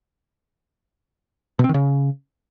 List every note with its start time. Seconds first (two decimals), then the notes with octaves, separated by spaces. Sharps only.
1.59 B2
1.64 C4
1.69 D#3
1.74 C#3